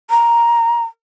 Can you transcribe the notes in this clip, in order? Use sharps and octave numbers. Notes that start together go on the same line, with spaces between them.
A#5